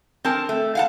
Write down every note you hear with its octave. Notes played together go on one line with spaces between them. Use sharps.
C4 A#4 A5
A3
F5 F#5 A5